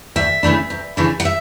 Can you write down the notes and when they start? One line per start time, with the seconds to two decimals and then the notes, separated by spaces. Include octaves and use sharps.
0.16 D2 E5
0.43 C#3 E3 A3 D4
0.70 D2
0.97 C#3 E3 A3 D4
1.20 F#5
1.25 E5